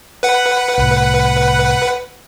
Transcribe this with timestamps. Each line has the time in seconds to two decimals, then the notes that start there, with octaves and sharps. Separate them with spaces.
0.23 B4 F#5
0.78 C2 A2